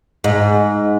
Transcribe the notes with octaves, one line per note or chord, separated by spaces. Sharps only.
G#2